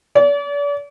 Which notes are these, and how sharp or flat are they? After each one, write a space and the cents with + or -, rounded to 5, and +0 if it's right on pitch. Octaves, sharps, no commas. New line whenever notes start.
D5 -40